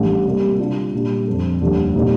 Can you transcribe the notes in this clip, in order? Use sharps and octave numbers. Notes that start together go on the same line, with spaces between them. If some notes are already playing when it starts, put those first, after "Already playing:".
Already playing: A1 A2 G3 D4 G4
C3 G3 A#3
D3 G3 D4 F4
A#2 G3 D4
F2 D3 A3 D4 A4
F1 D#2 D3 G3 D4
A#2 G3 C4 D#4